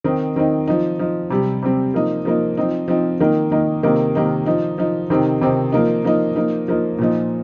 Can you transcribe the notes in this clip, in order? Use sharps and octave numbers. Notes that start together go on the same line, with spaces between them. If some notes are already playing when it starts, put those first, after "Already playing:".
D#3 C4 D#4
D#3 C4 D#4
F3 D#4
F3 D#4
C3 G3 C4
C3 G3 C4
F3 A#3 D#4
F3 A#3 D#4
F3 C4 D#4
F3 C4 D#4
D#3 A#3 D#4
D#3 A#3 D#4
C3 D#3 A#3 D#4
C3 D#3 A#3 D#4
F3 D#4
F3 D#4
C3 D#3 C4 D#4
C3 D#3 C4 D#4
F3 A#3 D#4
F3 A#3 D#4
F3 A#3 D#4
F3 A#3 D#4
A#2 F3 D#4